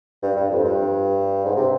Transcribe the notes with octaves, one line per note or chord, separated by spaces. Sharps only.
G2
G2
F2
G2
G#2
C3